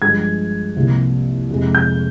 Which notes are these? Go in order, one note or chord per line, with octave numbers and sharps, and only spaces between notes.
G2 F3 G#3 G#6
C2 C3 F3 A#3
F2 C3 F3 G#3
G6